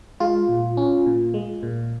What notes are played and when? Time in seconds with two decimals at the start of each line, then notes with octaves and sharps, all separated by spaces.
0.20 G#3 F4
0.49 A#2
0.77 C#4
1.06 A#2
1.34 G#3
1.63 A#2